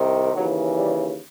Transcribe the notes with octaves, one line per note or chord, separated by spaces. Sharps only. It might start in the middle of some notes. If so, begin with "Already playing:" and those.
Already playing: C2 C3 D#3
D#2 C#3 E3 F#3
G3